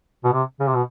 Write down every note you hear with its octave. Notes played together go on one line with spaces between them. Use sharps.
B2
C3
C#3
C3
B2